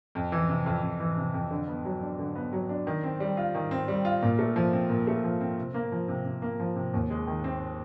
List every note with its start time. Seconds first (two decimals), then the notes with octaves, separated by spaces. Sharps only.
0.15 F2
0.32 E3
0.49 C3
0.66 F2
0.83 F2
1.00 E3
1.17 C3
1.34 F2
1.51 D3
1.68 B3
1.85 F#3
2.02 D4
2.19 D3
2.35 B3
2.53 F#3
2.69 D4
2.87 D#3
3.04 C4
3.20 G3
3.37 F4
3.55 D#3
3.71 C4
3.88 G3
4.05 F4
4.22 A#2
4.39 A3
4.56 F3
4.73 C4
4.89 A#2
5.07 A3
5.24 F3
5.41 C4
5.57 C3
5.74 A#3
5.92 F3
6.08 C3
6.25 C3
6.42 A#3
6.60 F3
6.76 C3
6.94 D#2
7.10 G#3
7.27 D#3
7.44 C4